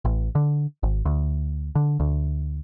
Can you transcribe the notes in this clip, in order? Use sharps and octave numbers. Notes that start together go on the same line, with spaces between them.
A1
D3
G#1
D2
D3
D2